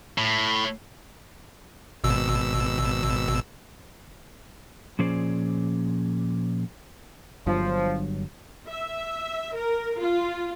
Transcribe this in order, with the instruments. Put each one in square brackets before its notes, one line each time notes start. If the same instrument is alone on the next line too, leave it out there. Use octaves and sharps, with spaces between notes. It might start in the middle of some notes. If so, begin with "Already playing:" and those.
[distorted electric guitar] A2
[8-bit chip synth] G#1 B2 E6
[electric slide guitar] A#2 F3 C#4 G#4 C5 D5
[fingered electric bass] G1 G2 F#3 [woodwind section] F3
[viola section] E5
A#4
F4